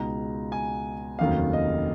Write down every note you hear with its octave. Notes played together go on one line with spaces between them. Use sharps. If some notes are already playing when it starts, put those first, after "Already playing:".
Already playing: C#2 B2 G#3 D#4 A#5
G#5
F1 D#2 D#3 F#3 C#4 F5
D#5